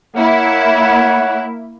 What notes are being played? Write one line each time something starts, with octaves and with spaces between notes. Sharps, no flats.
A#3 E4 C#5 F#5